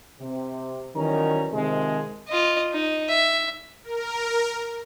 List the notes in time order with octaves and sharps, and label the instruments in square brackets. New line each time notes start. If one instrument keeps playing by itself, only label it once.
[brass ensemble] C3
D#3 E3 F#3 G3 C#4 A#5
C3 D#3 F3 G#3
[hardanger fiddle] F4 D#5
D#4
E5
[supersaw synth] A#4